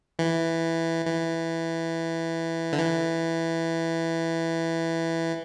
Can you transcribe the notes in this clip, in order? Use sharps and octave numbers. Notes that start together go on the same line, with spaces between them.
E3
E3
D3
E3